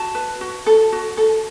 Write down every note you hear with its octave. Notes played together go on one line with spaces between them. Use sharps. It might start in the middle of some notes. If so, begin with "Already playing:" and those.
Already playing: F#4 A5
B4
F#4
A4
F#4
A4